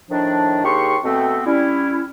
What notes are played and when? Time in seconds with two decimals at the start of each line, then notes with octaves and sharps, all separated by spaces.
0.10 A2 D#3 F3 D4
0.64 D#2 G4 G#4 C6 C#6
1.04 B2 A3 B3 C4
1.46 G3 C#4 E4